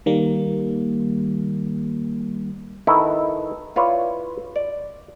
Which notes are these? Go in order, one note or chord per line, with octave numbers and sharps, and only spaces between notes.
D#3 G3 A#3
D#3 E4 A4 B4
E4 F4 B4 C#5 D5
D5